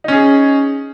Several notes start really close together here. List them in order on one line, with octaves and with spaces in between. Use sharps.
D#4 C#4 G#4